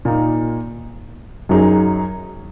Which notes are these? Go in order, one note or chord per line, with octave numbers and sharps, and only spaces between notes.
A#2 A#3 D#4
F#2 F#3 D#4 G#4